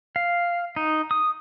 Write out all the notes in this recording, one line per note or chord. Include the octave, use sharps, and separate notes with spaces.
F5
D#4
D#6